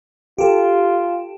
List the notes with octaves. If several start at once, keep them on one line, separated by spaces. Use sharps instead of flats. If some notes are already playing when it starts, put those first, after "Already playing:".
F4 G4 A4